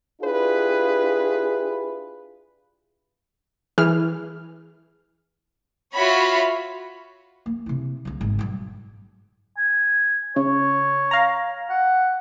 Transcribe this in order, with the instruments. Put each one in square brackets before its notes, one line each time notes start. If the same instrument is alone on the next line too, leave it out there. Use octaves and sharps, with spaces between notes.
[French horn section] D4 E4 F4 G4 G#4 B4
[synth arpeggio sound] E3 G#4 F6
[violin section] F4 F#4 C#5 E5 B5
[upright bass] A#3
C3 E4
C2 D3
G#1
B1 G2
[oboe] G#5
[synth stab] C#3 [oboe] C#5
[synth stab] F5 A#5
[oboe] F#5